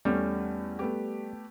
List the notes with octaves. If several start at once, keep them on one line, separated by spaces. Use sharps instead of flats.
E2 G3 A3 C#4
A3 B3 G4